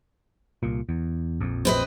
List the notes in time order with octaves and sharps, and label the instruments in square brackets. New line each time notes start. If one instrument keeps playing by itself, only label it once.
[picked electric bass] C2 A#2
E2
A#1 F2
[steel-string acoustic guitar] C4 B4 D#5